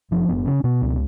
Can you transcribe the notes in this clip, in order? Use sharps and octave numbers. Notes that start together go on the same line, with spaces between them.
F#1 F3
F#1 B3
C#3 C#4
B2 B3
C#2